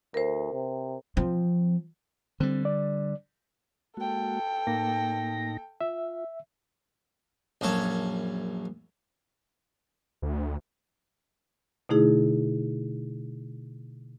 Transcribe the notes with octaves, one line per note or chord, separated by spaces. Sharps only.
D2 A#4 C5
C3
F3 C4
D3 G3 C4
D5
G#3 A#3 F#4 A4 G5
A2 A#3 D#4 A#6
F4 E5
A#1 F#2 A4 C#5
D2
B2 D3 A3 D#4 E4 G#4